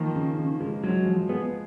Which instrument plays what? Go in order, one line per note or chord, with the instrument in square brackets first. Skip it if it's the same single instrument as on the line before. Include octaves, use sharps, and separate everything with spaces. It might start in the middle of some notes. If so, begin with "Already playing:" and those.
Already playing: [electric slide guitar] D#3 [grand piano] F3 A#3
[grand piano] C#3
C#3
G#3
[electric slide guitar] F#3 [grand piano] G#3
[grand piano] F3
[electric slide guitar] B3 [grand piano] G#4